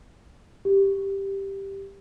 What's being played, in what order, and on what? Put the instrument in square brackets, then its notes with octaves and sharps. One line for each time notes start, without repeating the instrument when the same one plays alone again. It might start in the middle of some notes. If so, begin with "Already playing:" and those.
[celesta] G4